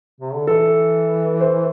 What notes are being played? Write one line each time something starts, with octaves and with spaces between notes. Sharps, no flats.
C3
D3
E3 A4
C5